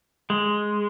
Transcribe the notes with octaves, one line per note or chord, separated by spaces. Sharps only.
G#3